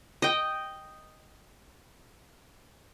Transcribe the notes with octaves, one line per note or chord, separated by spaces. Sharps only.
D#5 G5